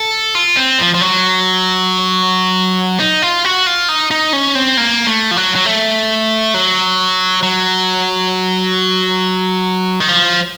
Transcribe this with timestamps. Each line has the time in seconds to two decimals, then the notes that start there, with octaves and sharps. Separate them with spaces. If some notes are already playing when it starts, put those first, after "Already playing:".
Already playing: A4
0.35 F4
0.57 C4
0.79 F3
0.94 F3
1.01 F#3
2.99 D#4
3.22 F4
3.45 F#4
3.67 F4
3.89 D#4
4.11 D#4
4.33 C#4
4.55 C4
4.77 A#3
5.07 A3
5.31 F3
5.37 F#3
5.56 F#3
5.66 A3
6.54 F#3
7.43 F#3
10.00 D#3
10.09 F3